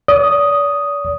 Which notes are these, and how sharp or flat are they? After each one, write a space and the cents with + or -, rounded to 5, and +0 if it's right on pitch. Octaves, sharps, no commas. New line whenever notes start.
D5 -40 D#6 +0